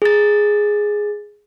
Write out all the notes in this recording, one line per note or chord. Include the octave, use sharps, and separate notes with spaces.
G#4 A6